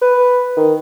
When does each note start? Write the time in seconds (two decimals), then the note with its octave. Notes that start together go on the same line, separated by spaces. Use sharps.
0.02 B4
0.56 D#3